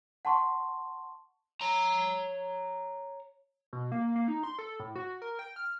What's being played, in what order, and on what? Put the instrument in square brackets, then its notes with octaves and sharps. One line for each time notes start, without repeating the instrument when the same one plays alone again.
[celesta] F#5 A5 C6 C#6
[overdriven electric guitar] C#5 A#5
[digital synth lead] B2
A#3
A#3
D#4
C6
A4
A2
F#4
A#4
G5
F6